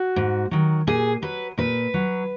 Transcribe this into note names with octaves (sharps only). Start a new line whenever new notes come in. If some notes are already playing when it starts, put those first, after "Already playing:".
Already playing: F#4
G#2
D#3 F#3
A#2 G#4
F#3 B4
A#2 B4
F#3